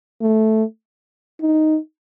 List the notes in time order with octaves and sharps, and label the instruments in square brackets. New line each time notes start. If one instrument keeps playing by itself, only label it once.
[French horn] A3
D#4